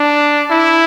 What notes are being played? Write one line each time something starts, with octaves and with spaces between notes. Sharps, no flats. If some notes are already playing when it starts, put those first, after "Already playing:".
Already playing: D4
E4